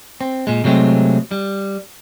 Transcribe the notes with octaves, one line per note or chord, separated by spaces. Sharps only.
C4
A#2 G#3
C3 F#3 G#3 A3 C4
G3